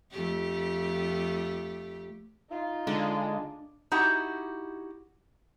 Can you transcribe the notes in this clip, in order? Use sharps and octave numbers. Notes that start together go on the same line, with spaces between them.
F2 A3 G4
D#4 F4
D3 G#3
D#4 E4 F#4 G4